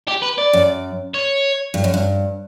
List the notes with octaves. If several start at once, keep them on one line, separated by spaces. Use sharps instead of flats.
G4
B4
D5
F#2
C#5
G2
F#2
G2